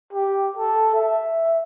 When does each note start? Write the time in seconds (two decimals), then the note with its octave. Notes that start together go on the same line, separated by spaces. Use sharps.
0.13 G4
0.57 A4
0.94 E5